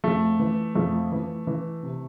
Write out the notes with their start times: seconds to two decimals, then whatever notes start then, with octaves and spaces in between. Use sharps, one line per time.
0.04 F2 A3
0.39 E3
0.75 F2 A3
1.12 E3
1.47 E3
1.83 C3